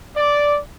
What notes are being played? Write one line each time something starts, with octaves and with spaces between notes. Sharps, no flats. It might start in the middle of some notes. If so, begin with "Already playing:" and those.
D5